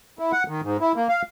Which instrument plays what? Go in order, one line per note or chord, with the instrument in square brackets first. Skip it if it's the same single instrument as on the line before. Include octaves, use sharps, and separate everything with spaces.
[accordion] E4
F#5
D#3
G#2
E4
A#3
F5